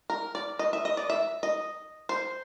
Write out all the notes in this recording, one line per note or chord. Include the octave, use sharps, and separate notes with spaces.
A#4
D5
D#5
E5
D#5
D5
E5
D#5
C5